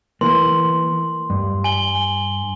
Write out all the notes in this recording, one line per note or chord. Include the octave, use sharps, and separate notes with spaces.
E3 A#3 C6
G2
G#5 F#7 G7